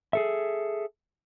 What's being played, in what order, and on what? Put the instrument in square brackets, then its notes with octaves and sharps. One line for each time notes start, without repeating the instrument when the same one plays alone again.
[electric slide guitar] G#4 A4 E5